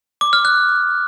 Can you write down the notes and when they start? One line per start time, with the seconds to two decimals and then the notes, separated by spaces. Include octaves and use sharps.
0.21 D6
0.33 F6
0.45 F#6